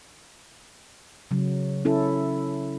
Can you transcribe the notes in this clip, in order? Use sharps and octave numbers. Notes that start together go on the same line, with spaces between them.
C#3 F#3
C#4 E4 A4